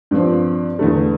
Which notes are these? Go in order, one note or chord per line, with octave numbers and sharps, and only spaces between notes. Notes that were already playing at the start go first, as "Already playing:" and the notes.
G2 F3 C4
E2 D3 A3